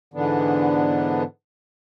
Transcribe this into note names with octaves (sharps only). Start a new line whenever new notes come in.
G#2 D3 E3 B3 D4